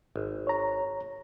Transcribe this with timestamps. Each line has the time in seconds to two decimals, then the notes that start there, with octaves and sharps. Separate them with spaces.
0.16 G#1
0.47 C#5 A#5